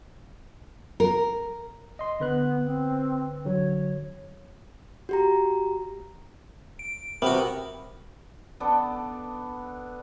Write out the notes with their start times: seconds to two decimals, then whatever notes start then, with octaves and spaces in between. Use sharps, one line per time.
1.00 A#4
1.99 D#5 C6
2.20 D3 B3 B4 F#6
2.65 C4
3.45 D3 F#3 C#5
5.09 F#4 G4 A#5
6.79 D7
7.22 C3 B3 F#4 A#4
8.60 B3 D4 A4